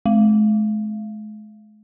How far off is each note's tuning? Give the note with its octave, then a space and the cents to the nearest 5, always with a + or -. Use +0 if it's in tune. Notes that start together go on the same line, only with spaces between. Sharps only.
G#3 +45